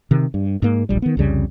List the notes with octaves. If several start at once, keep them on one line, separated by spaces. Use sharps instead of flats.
C3 D#3
G2
G#2 A#3
D1 A#1 G3
D#3 B3
C2 F2 C#3 G3